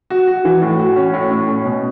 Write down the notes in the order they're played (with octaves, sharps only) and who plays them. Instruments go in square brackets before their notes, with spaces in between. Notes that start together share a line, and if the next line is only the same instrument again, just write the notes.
[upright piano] F#4
F#4
E3
A2
F#4
C#4
A2
A2
C#4
B2